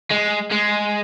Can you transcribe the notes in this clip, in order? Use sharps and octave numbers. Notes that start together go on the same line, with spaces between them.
G#3
G#3